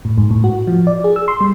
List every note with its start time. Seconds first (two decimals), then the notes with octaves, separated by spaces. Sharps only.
0.05 A2
0.18 G#2
0.31 A2
0.44 F#4
0.67 F3
0.87 D5
1.04 G#4
1.16 E6
1.28 C6
1.41 G3